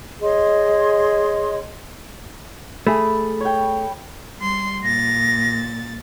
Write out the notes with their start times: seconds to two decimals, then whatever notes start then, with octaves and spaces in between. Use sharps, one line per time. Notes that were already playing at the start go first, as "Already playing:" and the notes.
0.22 G#4 C#5 D#5 C6
2.87 A3 G#4 B5
3.41 C#5 G5
4.37 G3 C6
4.84 A#2 A6 A#6